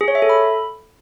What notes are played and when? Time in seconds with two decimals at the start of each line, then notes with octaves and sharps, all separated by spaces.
0.01 G#4
0.08 C#5
0.15 E5
0.22 A4
0.29 B5